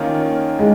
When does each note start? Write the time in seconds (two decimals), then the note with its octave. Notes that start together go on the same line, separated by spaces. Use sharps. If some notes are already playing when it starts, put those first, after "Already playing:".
Already playing: D#3 A#3 C#4 F4
0.59 G#3